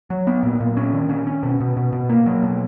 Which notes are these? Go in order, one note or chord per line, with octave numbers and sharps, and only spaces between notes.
F#3
B3
A#2
A#2
C#4
D#3
C#4
C#4
B2
B2
B2
B2
A#3
F#3
B2